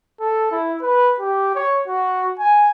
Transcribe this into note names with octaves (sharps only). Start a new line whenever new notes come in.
A4
E4
B4
G4
C#5
F#4
G#5